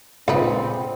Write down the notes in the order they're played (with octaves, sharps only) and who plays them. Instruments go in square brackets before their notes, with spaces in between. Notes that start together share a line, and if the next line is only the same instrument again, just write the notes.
[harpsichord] C#2 [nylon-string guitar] A#2 [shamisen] D3 D#4 B4 [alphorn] C4